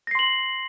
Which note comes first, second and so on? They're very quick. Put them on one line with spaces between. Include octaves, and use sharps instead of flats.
A#6 C7 C6 F#7